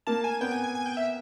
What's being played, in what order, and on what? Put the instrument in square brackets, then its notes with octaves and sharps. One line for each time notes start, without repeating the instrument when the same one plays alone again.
[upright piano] A#3 [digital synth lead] A5
[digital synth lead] G#5
[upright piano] B3 [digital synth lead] G5
[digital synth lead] G#5
G#5
G#5
G5
E5